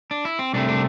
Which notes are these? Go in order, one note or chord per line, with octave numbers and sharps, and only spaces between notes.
D4
E4
C4
C2 C3 A3 D4
D4